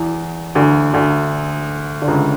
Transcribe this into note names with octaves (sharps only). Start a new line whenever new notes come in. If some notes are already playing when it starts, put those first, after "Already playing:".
Already playing: E2 E3
D2 D3
D2 D3
D3
C#2 C#3